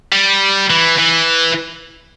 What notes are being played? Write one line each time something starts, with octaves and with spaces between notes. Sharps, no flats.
G3
E3
E3